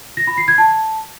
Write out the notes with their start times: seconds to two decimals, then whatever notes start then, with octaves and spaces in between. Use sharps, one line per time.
0.17 A#6
0.27 B5
0.38 C7
0.48 G#6
0.58 A5